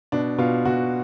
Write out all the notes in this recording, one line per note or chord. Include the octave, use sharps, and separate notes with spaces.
B2 D4
B2 F4
B2 F#4